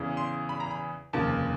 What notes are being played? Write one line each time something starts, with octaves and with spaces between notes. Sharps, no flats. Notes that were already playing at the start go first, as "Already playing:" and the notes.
Already playing: E2 C#3 E3
C6
B5
A#5
B5
F1 D#2 C#3 F3 A5